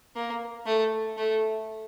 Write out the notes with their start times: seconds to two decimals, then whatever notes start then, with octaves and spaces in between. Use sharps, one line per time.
0.16 A#3
0.66 A3
1.17 A3